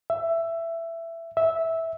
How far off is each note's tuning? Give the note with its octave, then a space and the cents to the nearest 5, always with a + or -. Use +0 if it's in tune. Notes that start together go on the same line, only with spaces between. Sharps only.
E5 +15
E5 -10